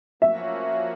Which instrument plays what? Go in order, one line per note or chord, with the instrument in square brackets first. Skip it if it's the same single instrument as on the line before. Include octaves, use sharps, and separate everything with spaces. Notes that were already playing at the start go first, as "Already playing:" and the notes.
[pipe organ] F3 A#3 C#4 F#4 [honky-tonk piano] E5